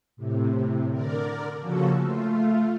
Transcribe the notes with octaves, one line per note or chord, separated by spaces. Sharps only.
A2 C3
D3 A#4 D5
C#3 F3 A#3 C#4 F#4 A4
A3 F4